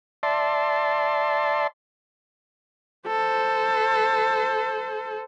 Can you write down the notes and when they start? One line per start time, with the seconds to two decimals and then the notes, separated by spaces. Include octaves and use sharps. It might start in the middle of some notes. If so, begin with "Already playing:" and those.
0.23 D5 E5 A5 C6
3.08 A4 C5